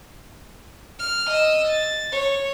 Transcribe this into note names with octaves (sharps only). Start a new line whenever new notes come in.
F6
D#5 E6
A6
C#5